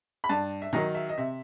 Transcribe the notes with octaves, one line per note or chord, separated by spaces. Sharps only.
B5
G2 A5
E5
D#3 F#3 D#5
E5
D#5
C3 E5